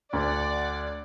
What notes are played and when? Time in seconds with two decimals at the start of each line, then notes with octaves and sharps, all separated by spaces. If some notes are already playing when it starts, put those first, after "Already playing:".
0.13 D2 D5 F#5